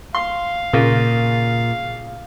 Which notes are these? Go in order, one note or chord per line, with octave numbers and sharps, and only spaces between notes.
F5 C6
A#2 C#3 A#3 F4